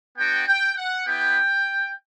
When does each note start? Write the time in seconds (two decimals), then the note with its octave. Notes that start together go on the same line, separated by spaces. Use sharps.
0.17 B3 D4 F#4 G5
0.47 G5
0.77 F#5
1.07 B3 E4 G4 G5